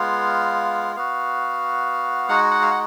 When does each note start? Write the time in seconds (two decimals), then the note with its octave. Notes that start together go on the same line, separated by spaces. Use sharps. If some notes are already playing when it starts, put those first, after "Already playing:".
Already playing: G#3 B3 F4 F5
0.96 B3 F#4 F5
2.29 G#3 D#4 F#4 F#5
2.51 F#5
2.62 F5
2.71 F#5